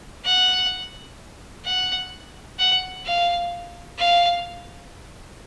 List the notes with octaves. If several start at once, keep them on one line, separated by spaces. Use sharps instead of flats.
F#5
F#5
F#5
F5
F5